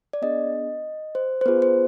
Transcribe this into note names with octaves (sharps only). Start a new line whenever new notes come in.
D5
B3 D4 G#4 D#5
C5
C5
B3 F4 G#4 B4
C5